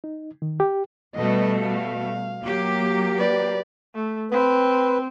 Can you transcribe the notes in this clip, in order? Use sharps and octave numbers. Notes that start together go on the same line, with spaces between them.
D#4
D#3
G4
B2 G3 A3 B4 D#5
F5
F#3 A#3 G4
B4 D5
A3
C4 B4